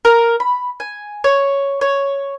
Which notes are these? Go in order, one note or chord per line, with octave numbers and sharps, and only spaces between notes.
A#4
B5
G#5
C#5
C#5